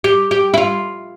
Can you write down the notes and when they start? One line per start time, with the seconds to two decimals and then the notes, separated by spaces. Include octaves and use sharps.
0.04 G4
0.31 G4
0.54 E4
0.58 F4